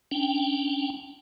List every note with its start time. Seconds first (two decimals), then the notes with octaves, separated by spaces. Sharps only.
0.11 C#4 D4 G5